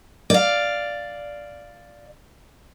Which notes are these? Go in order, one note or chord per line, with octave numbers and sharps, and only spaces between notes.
D5 F5